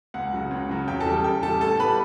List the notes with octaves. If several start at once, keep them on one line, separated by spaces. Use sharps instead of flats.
C#2 F#5
C#3 F#3
C#2
C#3 F#3
E2 G5
A4 A5
C#3 G3
G5
E2 G5
C#3 G3 A4 A5
A2 A4 A5
G3 B3 B4 B5